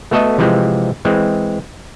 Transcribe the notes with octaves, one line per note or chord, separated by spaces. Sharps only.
A3 B3 F#4 A4 D#5 E5
C3 E3 F3 G#3 C4
E3 G#3 C4